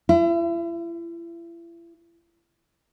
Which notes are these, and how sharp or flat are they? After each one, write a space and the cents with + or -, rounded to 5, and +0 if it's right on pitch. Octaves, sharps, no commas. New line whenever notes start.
E4 +40